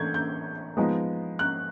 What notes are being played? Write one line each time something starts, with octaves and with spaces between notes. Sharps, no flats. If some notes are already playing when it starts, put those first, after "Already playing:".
Already playing: E3 A3 D4 G6 G#6
G6
F3 G#3 B3 D#4
F#6